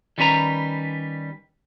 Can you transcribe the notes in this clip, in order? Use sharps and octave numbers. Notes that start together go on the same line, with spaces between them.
D#3 G3 C#4 B4 A#5